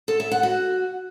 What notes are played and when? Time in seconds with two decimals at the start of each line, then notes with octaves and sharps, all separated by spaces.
0.08 A4
0.20 E5
0.31 F#5
0.43 F#4